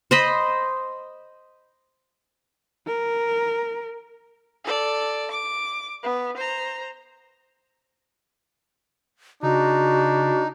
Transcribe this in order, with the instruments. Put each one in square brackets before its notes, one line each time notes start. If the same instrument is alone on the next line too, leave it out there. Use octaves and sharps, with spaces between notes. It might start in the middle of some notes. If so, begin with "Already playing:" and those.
[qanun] C5 D#5 B5
[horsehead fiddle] A#4
[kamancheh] A4 D5
D6
B3
C5 A#5
[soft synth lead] C#3 [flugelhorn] D4 [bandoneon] D#4 [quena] F#4